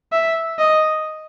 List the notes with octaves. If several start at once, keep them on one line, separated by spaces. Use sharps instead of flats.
E5
D#5